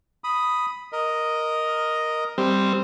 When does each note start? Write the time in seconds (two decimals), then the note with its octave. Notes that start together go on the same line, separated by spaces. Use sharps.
0.24 B5 D#6
0.92 A#4 D#5
2.38 G3 C4